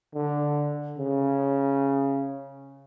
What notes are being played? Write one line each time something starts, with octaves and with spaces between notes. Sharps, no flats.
D3
C#3